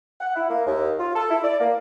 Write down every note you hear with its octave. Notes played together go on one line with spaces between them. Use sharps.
F#5
E4
A#3
D#2
F4
A4
E4
D5
A#3